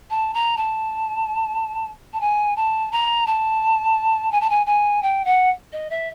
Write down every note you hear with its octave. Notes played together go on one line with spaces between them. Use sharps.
A5
A#5
A5
A5
G#5
A5
A#5
A5
G#5
A5
G#5
G#5
G5
F#5
D#5
E5